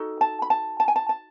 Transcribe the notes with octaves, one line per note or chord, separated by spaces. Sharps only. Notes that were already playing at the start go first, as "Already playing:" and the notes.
Already playing: D#4 F#4 A4
A5
B5
A5
A5
G#5
A5
A5